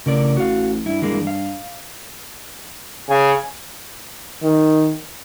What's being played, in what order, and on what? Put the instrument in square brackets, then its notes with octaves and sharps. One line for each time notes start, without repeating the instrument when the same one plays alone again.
[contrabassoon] A1 [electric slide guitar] C#3 A#4 D5
[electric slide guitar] F#4 F5
[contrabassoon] G2 [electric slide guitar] E4
[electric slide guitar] E3 G#3 A#3
F5
[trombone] C#3 [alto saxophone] G#5
[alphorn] D#3